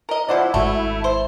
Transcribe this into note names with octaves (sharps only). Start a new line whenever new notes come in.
A#4 D#5
F3 E4 C5 D5 D#5 F#5
G#1 G#2 A3 F#4
C5